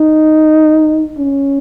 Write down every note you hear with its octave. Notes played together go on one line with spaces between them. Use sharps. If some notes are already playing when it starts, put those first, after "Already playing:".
Already playing: D#4
C#4